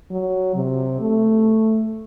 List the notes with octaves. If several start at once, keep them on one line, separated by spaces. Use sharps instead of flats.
F#3
C3
A3